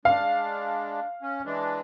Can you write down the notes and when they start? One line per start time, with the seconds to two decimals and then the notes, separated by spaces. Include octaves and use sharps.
0.05 G#3 D4 F5
1.22 C#4
1.45 E3 G#3 D4